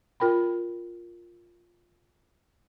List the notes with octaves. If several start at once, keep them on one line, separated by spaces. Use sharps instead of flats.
F4 A#4 G5 B5